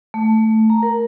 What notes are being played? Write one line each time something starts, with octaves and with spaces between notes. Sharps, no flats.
A3
A#5
A#4